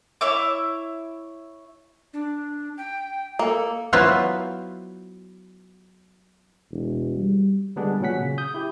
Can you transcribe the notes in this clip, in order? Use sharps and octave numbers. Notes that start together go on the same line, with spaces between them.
E4 C#5 E5 D6
D4
G5
A#3 A4
F#3 B3 E4 F4 B4 C5
E1
G3
D3 G3 G#3 B3 D4 G#4
A#2 D#3 F#3 C#4 F#5 B6
C#3
D#6 G6
E4 G4